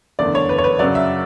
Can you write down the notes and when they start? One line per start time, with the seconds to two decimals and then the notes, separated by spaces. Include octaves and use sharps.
0.19 F#1 E2 D3 A3 D5
0.35 C#5
0.49 B4
0.58 C#5
0.64 B4
0.79 F#2 C#3 F#3 D5
0.95 E5